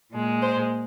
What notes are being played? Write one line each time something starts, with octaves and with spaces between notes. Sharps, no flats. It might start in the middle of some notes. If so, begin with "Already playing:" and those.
A#2 G#3
C5